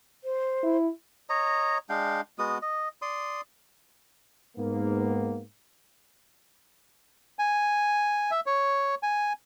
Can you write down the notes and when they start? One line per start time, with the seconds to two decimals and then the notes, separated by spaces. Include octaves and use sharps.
0.24 C5
0.64 E4
1.29 C#5 D#5 A#5
1.89 G#3 D4 F5 G5
2.39 G#3 B3 F#4 D#6
2.62 D#5
3.02 D5 C6 D#6
4.57 G#2 A#3 B3
7.39 G#5
8.31 E5
8.46 C#5
9.03 G#5